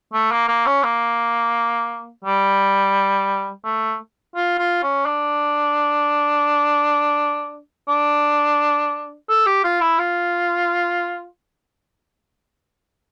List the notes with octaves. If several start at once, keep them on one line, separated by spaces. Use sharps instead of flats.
A3
A#3
A#3
C#4
A#3
G3
A3
F4
F4
C#4
D4
D4
A4
G4
F4
E4
F4